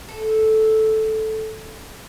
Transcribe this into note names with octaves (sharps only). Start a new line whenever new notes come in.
A4